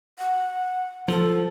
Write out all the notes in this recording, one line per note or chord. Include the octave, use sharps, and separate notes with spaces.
F#5
F3 A4